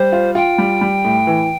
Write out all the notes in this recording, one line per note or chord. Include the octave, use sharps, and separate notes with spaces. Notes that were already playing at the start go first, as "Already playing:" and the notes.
Already playing: G3 C5
F4
F4 G5
G3
G3
A2
E3